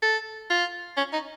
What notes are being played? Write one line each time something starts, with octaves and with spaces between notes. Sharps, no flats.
A4
F4
C#4
D#4